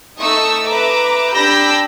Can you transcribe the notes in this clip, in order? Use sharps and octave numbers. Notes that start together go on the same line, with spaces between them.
A3 D#4 C#6 D#6 E6
B4 E5 A#5 D6
D4 G4 B5 E6 G6 A#6